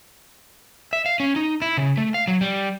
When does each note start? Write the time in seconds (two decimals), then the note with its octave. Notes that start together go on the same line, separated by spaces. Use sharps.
0.93 E5
1.06 F5
1.20 C#4
1.36 D#4
1.62 E4
1.77 C#3
1.97 A3
2.14 F5
2.28 F#3
2.41 G3